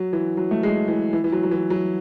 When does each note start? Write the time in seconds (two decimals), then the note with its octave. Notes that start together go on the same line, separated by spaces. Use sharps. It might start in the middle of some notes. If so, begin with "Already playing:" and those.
Already playing: F#3
0.13 E3
0.37 F#3
0.51 A3
0.63 G#3
0.88 E3
1.13 E3
1.24 E3
1.32 F#3
1.43 F#3
1.51 E3
1.70 F#3